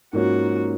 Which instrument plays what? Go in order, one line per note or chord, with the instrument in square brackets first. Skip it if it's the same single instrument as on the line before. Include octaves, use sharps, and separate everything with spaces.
[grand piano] G#2 F3 A#3 C#4 [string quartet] F#4